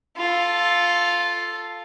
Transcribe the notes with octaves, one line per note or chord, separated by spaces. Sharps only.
F4 A4